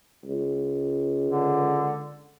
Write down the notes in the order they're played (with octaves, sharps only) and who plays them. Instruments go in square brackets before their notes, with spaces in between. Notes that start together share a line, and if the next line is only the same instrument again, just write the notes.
[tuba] C#2
[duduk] D3